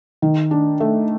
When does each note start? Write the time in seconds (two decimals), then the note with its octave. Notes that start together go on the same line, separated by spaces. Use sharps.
0.22 D#3
0.51 D4
0.80 A3